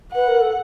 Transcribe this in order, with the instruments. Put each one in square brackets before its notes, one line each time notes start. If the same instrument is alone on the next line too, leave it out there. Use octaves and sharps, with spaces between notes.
[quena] B4 [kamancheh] F#5
[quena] A#4
A4